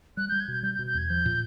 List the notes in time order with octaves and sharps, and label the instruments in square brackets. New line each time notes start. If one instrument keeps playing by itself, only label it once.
[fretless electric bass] G3 [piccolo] F#6
[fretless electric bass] G3 [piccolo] G6
[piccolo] G#6
[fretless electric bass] B2 [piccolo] G6
[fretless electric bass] G3 [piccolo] G6
[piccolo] G6
[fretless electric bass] B2
[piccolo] G6
[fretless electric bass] E2 [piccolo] G#6
[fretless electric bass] F3 [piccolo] G6
[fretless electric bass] A#2